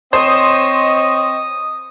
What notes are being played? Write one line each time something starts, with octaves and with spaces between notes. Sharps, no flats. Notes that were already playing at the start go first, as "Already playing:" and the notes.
C4 C5 C#5 D#5 D#6